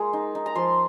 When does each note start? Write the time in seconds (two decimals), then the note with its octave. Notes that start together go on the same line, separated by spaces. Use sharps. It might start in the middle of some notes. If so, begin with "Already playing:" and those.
Already playing: G#3 A#3 F4
0.13 D#4
0.35 D#4
0.46 A#5
0.55 F3 C6